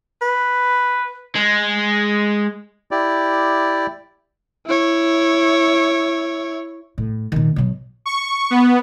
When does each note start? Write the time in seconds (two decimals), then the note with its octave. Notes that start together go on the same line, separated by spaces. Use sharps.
0.21 B4
1.35 G#3
2.91 E4 G4 D5
4.66 E4 C#5
6.98 A2
7.32 A#2 D#3
7.56 B2 F#3
8.06 C#6
8.50 B3